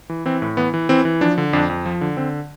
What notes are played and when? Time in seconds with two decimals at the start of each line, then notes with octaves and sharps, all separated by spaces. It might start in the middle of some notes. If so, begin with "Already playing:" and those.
0.10 E3
0.25 E3 C4
0.42 A2
0.57 E3 B3
0.74 E3
0.89 E3 C4
1.05 E3
1.21 F3 D4
1.38 D3
1.53 F2 D4
1.70 F2
1.86 F3
2.01 D3
2.17 D3 C4